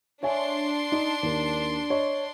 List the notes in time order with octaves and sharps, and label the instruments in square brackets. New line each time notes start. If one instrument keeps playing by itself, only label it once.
[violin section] D4 C6 [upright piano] C#5 E5 G#5
[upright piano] D#4
D#2 A#4
C#5 D#5